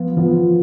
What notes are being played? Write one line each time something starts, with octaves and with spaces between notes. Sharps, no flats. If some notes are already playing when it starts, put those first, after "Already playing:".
Already playing: F3 B3 F4
F3 B3 F4